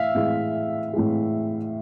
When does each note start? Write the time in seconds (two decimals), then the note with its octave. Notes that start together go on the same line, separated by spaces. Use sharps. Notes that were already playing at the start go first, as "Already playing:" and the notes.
Already playing: A2 E3 E5 F5
0.15 A2 E3 G#3
0.93 A2 E3 G#3